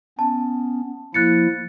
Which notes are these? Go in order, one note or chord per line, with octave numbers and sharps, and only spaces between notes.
B3 C#4 A5
F3 A#3 E4 F#6 A6 C#7